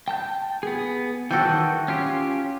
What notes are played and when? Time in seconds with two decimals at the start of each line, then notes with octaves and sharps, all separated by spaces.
0.08 G5 A5 G6
0.63 B3 G#4
1.31 D#3 E3 F#4 A4 G5
1.88 C#4 F4 G4